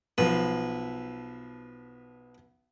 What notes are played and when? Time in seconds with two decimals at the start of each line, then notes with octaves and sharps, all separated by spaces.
0.18 B1 F3 B4